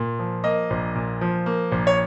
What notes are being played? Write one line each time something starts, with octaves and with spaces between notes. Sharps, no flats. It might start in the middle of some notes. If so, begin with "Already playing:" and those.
Already playing: A#2
F3
A#3 D#5
A#1
A#2
F3
A#3
A#1
C#5